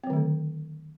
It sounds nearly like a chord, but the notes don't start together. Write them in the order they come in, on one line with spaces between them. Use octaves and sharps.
C4 F#3 D#3 A3 D3